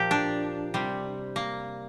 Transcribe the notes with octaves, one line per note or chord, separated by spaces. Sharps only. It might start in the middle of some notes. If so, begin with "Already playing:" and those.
Already playing: A#2 F3 G4 A#4
D4
C3 G3
A#3